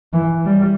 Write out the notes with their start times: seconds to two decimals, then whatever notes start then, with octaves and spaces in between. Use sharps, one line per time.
0.13 E3
0.45 G3